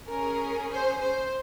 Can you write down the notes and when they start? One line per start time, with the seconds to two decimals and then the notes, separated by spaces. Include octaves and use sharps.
0.09 C#4 G#4 A#4
0.72 C5
1.03 C5